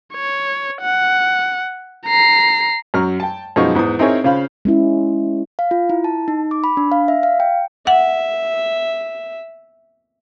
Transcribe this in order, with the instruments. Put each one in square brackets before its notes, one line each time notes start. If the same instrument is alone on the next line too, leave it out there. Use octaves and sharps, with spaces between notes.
[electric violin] C#5
F#5
A#5 C7
[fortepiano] F#2 F#3 A#5 C#6 F6
G5 A5
F#2 B2 F3 G#3 D#4 C#6
E2 G#2 B3 D#6
C4 D#4 E4 G#4 A#4 C#5
C#3 F4 C5 F5 B5
[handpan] G#3 C#4 E4
[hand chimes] F5
F4
E4
A5
D#4
D6
B5
D4
F5
E5
F5
G5
[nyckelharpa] E5 [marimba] F#5